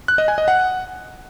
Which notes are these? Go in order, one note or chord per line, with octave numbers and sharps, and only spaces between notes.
F#6
D#5
G#5
D#5
F#5